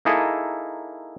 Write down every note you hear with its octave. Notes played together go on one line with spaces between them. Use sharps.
A#3 D#4 E4 G#4 A4